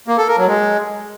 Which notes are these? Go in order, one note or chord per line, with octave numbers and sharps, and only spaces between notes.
A#3
A4
A#4
F#3
G#3